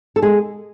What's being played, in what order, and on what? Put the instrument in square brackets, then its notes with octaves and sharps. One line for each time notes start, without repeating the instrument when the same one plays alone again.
[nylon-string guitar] A4
G#3 G#4